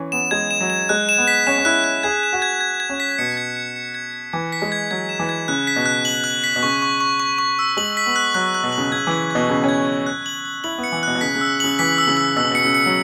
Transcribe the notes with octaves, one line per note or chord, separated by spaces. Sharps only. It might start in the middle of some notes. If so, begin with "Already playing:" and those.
Already playing: E3 C#4
B3 E7
G#3 G#6
E7
F#3
E7
G#3 F#6
E7
B3
B6
C#4 E7
C#4
E4 F#6
F#6
G#4 G#6
E7
F#4
G#6
G#6
G#6
C#4
B6
B2 C#7
G#6
C#7
C#7
G#6
G#6
E3 G#6
B6
G#3
G#6
F#3 G#6
E7
E3
G#6
C#3 F#6
B6
B2
F#6
F#7
F#6
B6
B2
C#3 C#6
C#6
C#6
C#6
C#6
E6
G#3 F#7
B6
B3
F#6
F#3 F#6
F#6
B2
F#7
C#3
C#3 G#6
E3 F#7
B2 G#6
C#3 G#6
C#4 G#6
G#6
F#6
F#7
F#7
E4 F#7
B3
C#7
E3
B2 F#6
B2
C#3 B6
C#3
E6
C#3 F#7
E3 B6
E6
C#3
E6
B2 E6
C#3
B2 C#7
C#3
C#7
F#3